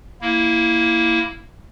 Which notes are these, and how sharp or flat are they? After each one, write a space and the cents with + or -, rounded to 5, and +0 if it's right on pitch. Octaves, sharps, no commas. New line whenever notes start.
A#3 +0 E4 +0